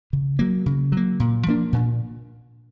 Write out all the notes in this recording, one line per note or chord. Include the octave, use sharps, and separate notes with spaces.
C#3
F#3 A#3
C#3
F#3 A#3
A#2
F3 A#3 D4
A#2